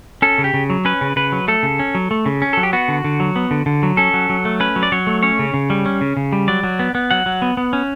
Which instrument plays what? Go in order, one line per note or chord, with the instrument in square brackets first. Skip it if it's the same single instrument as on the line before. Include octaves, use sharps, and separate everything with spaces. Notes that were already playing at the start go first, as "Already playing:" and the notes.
[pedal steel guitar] C#4 A4
C#3
G4
C#3
F#3
C#4 B4
C#3
C#3 B4
F#3
A3 A4
C#3
C#4
F#3
A3
C#3
C#4
F#3 A4
G4
B3 F#4
D3
D3
F#3
B3
D3
D3
F#3
C#4 A4
F#3
F#3
A3
C#4 B4
F#3
D5
F#3 C#5
A3
C#4 C#5
C#3
C#3
G3
C#4
C#3
C#3
G3
F#3 D5
F#3
B3
B3
F#3 F#5
F#3
B3
B3
C#4